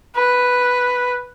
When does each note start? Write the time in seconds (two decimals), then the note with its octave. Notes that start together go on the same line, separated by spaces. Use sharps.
0.16 B4